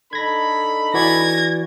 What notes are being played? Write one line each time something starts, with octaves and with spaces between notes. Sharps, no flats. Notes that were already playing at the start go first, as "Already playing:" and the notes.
D4 D#4 A4 B5 G#6 A#6
E3 F#4 D5 G#6 A#6